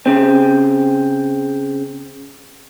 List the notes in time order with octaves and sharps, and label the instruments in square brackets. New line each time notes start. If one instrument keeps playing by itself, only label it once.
[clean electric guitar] C#3 C4